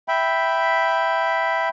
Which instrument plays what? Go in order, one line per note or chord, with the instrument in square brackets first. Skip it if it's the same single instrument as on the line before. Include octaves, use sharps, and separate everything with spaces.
[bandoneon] E5 G5 B5